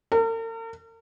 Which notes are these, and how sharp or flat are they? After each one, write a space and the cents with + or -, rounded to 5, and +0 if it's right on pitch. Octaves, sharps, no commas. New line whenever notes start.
A#4 -45